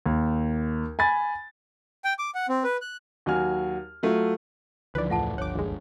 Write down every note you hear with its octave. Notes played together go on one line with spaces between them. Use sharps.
D#2
G#5 B5 A6
G5
D6
F#5
C4
B4
F#6
D#2 F#3 F#4 G#5 F6
F#3 A3 F4
C#2 D3 E3 F3 B4 D5
E2 A2 A3 F4 F#5 A5
G1 D3 C#5 F#5 D6
A#1 D#2 G#3